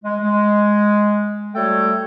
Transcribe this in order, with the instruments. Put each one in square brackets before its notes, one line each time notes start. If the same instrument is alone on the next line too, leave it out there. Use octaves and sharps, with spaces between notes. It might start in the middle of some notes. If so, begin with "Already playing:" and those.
[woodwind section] G#3
G#3
G3 A3 F#4 A4 C#5 G5